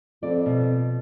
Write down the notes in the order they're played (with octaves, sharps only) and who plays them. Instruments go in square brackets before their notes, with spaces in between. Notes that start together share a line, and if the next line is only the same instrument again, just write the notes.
[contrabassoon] F2 [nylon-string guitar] D5
[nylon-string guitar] B2